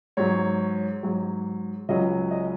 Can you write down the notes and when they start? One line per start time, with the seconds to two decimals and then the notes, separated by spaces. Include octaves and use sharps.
0.17 G#2 F#3 C#5
1.03 G#2 F#3
1.89 C#2 C#3 F#3 D#5
2.31 D#5